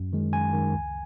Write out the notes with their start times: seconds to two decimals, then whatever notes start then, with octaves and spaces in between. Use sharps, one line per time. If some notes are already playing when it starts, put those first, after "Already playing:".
Already playing: F#2
0.13 D#3 G#3
0.33 F#2 G#5
0.53 D#3 G#3
0.74 C#2